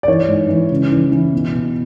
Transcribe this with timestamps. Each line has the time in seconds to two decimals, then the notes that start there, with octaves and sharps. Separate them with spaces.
0.03 D5
0.08 E3 C#5
0.28 G#2
0.49 E3
0.70 C#3
0.92 E3
1.12 E3
1.33 B2
1.54 B2